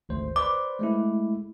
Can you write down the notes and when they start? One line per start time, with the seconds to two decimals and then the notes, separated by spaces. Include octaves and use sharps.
0.09 G#1 D2 C5
0.36 B4 C5 D5 D6
0.79 G#3 A3 E4